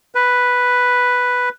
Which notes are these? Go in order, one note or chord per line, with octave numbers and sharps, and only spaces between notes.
B4